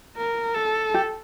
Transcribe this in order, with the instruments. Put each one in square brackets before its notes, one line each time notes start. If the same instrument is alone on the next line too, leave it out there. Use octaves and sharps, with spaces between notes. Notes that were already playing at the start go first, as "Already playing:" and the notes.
[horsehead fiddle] A#4
A4
[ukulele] G4